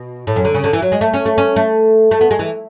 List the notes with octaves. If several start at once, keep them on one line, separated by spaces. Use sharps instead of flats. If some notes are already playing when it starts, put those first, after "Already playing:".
Already playing: B2
A2
F#2
D3
C#3
D3
E3
F#3
G#3
A3
C#4
A3
C#4
A3
A3
B3
G#3
E3